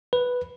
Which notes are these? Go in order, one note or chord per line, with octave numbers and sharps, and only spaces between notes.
B4